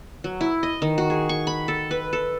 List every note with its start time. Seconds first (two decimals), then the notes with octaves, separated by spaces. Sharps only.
0.24 F#3
0.41 E4
0.63 D#5
0.82 D#3
0.98 F#4
1.10 G#4
1.29 C#6
1.47 B5
1.68 A4
1.91 B4
2.13 A4